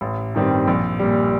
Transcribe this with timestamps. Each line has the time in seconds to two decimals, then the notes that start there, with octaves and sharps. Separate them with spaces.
0.01 A1
0.35 G2 D#3 G3 C4
0.67 A#1
0.99 A#2 G3